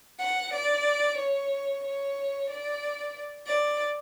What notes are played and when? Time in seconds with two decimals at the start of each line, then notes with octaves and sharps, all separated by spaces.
0.18 F#5
0.52 D5
1.17 C#5
1.82 C#5
2.48 D5
3.45 D5